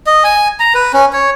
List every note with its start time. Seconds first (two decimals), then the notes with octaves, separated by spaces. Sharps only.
0.06 D#5
0.24 G#5
0.60 A#5
0.75 B4
0.94 C#4
1.13 C#5